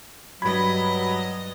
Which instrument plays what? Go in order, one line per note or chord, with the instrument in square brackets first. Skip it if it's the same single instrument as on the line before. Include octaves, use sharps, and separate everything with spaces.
[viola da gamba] G2 D#5 [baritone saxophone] F#3 [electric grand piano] B5 G#6